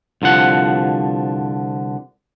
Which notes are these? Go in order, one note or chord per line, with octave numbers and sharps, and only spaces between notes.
C2 D3 F3 F#5